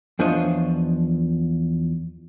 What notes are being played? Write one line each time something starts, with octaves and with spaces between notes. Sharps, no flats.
E2 F3 D4 F4 C#5 D#5